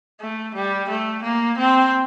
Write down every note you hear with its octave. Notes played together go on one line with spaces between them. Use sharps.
A3
G3
A3
A#3
C4